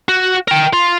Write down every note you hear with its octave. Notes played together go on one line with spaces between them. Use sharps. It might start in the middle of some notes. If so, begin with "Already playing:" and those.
F#4
A#4 G5
F4